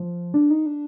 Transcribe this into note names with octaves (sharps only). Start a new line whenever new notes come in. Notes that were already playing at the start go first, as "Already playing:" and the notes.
Already playing: F3
D4
D#4
D4